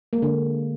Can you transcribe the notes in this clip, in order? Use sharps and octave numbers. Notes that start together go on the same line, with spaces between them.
D3 G#3 A#3